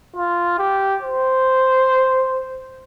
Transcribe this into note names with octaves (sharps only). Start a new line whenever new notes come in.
F4
G4
C5